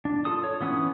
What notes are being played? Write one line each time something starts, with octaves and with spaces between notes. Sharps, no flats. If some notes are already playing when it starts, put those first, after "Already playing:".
D4
F4 A4 A5 D#6
C#5
E3 B3 C#4 D#6